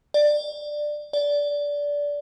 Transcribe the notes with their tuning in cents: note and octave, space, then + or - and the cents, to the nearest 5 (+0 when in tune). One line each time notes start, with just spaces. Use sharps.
D5 +15
D5 -15